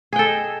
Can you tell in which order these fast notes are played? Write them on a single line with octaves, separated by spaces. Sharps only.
G#4 G5 A4 D#5